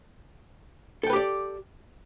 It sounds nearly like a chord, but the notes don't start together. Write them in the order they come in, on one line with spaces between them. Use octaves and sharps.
A4 G5 B4 G4 D5